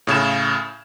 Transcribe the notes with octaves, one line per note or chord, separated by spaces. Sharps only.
A2 C#3 G#6 E7